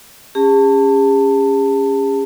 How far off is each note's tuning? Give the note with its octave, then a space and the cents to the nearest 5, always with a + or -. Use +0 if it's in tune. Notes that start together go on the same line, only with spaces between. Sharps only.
C#4 +0 G#4 -45 A5 +20